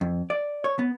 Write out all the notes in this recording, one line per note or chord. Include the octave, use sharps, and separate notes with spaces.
F2
D5
C#5
B3